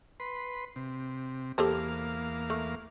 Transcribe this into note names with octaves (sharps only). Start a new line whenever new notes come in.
B4 C6
C3
E2 A#3 G4 A4 C5 F5
A3